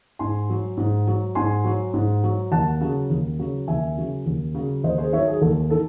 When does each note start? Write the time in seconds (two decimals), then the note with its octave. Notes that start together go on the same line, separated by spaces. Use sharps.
0.19 G#2 G#5 C6
0.50 F#3
0.77 G#2
1.07 F#3
1.35 G#2 G#5 C6
1.65 F#3
1.94 G#2
2.24 F#3
2.52 D#2 F#5 A5
2.81 C#3 F#3
3.10 D#2
3.39 C#3 F#3
3.67 D#2 E5 G#5
3.97 C#3 F#3
4.26 D#2
4.55 C#3 F#3
4.84 D#2 C5 D#5
4.98 G#4 C5
5.13 D#3 C#5 E5
5.17 F#3
5.27 G#4
5.41 D#2 A4
5.70 D#3 A4